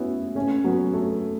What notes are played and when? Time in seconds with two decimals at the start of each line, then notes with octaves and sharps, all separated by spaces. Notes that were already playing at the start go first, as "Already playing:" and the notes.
Already playing: B3 C#4 E4 F#4
0.35 A3 C#4
0.64 F#3 B3
0.94 A3